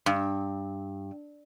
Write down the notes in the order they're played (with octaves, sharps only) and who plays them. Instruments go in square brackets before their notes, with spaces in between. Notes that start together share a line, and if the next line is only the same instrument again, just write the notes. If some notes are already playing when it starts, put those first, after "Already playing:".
[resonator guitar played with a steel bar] G2